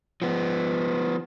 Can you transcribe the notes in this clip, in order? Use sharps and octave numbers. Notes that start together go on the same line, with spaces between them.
F3 B3